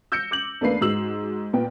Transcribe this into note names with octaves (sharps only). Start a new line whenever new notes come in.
E6 G6 A#6 C#7
D6 G6 F#7
E2 A3 A#3 D4 B4 C7
G#2 F#4 E6 F#7
A#2 B3 G5